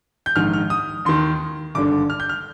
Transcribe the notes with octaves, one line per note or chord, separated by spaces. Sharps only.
G6
A#1 G#2 D#3 F6
F6
D#6
D#2 D#3 C6
G#1 G2 D3 D6
F6
G6
F6